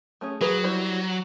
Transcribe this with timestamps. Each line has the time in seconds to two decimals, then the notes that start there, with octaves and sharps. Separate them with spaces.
0.21 A3 C#4 G#4
0.41 F#3 G#4 B4
0.64 G3 E4 C5